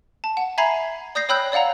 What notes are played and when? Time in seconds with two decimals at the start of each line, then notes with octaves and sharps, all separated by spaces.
0.24 A5
0.37 F#5
0.58 E5 G#5 A#5 B5 G#6 C7
1.15 D5 D#6 G6 A#6 C7
1.29 C#5 G5 B5 E6 F#6 G6
1.52 C#5 D5 F5 F#5 A#5